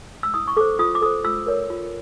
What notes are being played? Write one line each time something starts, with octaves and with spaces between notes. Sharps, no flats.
E6
E4 D#6
C#6
A4 C5 D6
F4 D#6
D6
A4 C5 D#6
F4 E6
A#4 C#5
F4